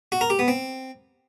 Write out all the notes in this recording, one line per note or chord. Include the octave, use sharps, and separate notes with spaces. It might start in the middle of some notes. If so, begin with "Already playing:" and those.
F#4
A#4
G4
B3
C4